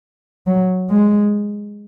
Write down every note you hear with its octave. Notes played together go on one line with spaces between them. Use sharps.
F#3
G#3